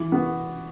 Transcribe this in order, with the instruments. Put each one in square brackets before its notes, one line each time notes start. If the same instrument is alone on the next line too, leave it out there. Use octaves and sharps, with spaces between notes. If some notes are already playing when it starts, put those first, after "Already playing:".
Already playing: [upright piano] E3
B3 F#4